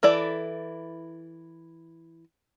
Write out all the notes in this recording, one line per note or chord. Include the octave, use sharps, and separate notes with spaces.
E3 E4 A4 D5